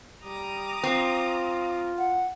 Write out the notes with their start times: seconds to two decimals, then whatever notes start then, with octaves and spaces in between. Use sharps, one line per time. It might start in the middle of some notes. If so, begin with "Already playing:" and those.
0.24 G3 A#5 D6 D#6
0.83 C4 F4
1.98 F#5